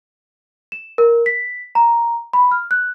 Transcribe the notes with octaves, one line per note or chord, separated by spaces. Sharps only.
E7
A#4
B6
A#5
B5
F6
F#6